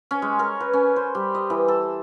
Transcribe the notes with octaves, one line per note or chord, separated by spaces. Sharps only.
C#4
G#3
A#4
B4
C#4
C5
G3
D#5
E3
A4